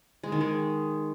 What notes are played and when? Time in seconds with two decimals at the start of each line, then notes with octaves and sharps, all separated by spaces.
0.23 G#3
0.32 D#3
0.41 G#3